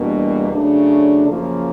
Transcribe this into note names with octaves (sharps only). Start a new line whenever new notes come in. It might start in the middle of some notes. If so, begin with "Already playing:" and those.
Already playing: E2 B2 G3 A#3 D4
C#3 F#3 A3 D4
F#2 C#3 F3 A#3